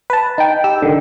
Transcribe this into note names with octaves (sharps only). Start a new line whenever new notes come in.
B4 A5
D#4 G5
G4 E6
D3 D#3